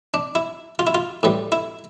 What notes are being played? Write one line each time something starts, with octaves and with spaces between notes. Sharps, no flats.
D4
E4
F4
E4
F4
A2 E3 G3
E4